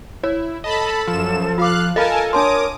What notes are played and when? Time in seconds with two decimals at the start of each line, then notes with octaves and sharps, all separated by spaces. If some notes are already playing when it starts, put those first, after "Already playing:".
0.23 E4 C#5
0.64 A4 D#5 A5 B5
1.07 F#2 F3 E7
1.58 F4 F5 D6 F#6
1.96 A4 A#4 D#5 F5 G#5 A5 B5
2.33 D4 A#4 C#5 A5 C6 D6 D#6